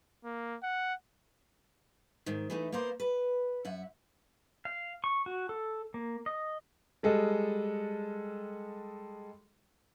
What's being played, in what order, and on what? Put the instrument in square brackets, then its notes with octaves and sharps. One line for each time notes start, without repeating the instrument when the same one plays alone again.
[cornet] A#3
F#5
[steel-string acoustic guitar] G#2 D#3
E3 A3 D#4
A#3 B3 A#4 C5
B4
F#2 E5 F#5
[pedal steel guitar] F5
C#6
F#4
A4
A#3
D#5
[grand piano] G3 G#3 A4 D#5